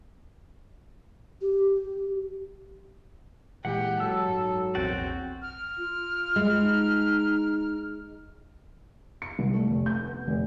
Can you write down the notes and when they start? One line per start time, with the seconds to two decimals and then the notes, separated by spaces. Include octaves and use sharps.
1.42 G4
3.65 A#2 E3 G#3 G4 F#5
4.00 F#3 A4 E6
4.29 G#2
4.75 A#1 E2 C4 F#4 G5 A6
5.42 F6
5.78 F4
6.36 G#3
6.61 D#4
9.22 C#7
9.39 C2
9.54 A3
9.70 F1
9.86 G6
10.07 B3
10.27 F1